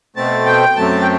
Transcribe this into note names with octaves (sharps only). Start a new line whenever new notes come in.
B2 A3 C4 A5
G5
F#2 F#3 A3 C4 A5
G5